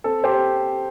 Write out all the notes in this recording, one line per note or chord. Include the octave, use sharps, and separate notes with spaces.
C4 A4
G4 C5